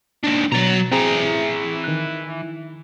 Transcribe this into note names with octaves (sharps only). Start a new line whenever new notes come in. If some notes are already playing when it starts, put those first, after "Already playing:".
D#2 D4
B2 F#3 A#5 A6
E3 C4 G#4 A#5
D#3 F#6